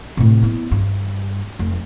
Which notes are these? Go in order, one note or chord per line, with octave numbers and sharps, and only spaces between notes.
A2 C3
B3 E4
G2
F1